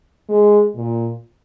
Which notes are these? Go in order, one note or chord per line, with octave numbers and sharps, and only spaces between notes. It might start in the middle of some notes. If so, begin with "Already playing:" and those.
G#3
A#2